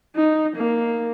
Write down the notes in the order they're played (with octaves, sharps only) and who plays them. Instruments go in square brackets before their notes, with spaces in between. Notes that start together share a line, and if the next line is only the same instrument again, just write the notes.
[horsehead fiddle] D#4
A#3